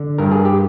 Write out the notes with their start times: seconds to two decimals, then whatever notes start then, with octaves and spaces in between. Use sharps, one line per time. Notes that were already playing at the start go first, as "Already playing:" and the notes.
Already playing: D3
0.18 G2 A#4
0.31 G#4
0.45 G4